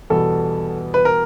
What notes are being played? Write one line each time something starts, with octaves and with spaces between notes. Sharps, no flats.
E2 B2 G3 B3 A4
B4
A#4